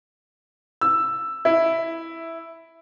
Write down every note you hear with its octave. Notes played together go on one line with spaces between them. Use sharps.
E6
E4